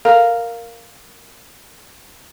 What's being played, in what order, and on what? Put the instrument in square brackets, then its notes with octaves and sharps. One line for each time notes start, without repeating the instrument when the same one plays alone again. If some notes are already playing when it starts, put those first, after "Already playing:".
[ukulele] A#4 [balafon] F5